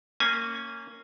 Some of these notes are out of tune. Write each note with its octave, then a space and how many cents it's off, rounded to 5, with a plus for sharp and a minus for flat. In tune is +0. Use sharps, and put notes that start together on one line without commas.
A#3 -20 C#4 +0 G#5 +0